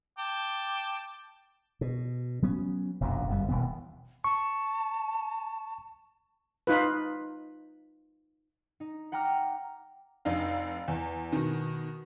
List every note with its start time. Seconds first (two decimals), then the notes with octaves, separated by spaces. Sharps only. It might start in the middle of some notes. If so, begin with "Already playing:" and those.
0.19 G5 A5 D6
1.81 B2
2.42 F#3 B3 C#4
3.00 F1 A#1 F#2 B2
3.28 G1 F#2 G3
3.49 D#1 B2 E3 B3
4.24 A5 C#6
6.67 D#4 F4 B4
8.80 D#4
9.12 F#5 G5 A#5 D6 F6 F#6
10.25 F1 D4 D#4 F5
10.88 E2
11.32 B2 D#3